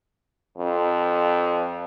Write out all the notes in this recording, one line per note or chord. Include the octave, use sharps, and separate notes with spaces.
F2